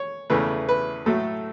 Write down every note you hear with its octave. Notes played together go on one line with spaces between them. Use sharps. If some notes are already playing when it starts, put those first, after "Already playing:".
Already playing: C#5
E2 C#3 E3 A3 B4
B4
A2 F#3 A3 A4